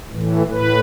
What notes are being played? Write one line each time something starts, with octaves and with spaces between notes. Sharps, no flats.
A2 E3
A2 B4